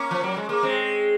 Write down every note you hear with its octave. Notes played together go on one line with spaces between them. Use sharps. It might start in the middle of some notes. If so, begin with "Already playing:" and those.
Already playing: A#3 C#4
F3
F#3
G#3
A#3
G#3 C4